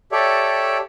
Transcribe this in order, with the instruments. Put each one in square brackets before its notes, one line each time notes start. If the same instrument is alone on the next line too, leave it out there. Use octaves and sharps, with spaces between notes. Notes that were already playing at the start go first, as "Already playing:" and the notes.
[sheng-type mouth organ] G4 A4 C#5 D5 E5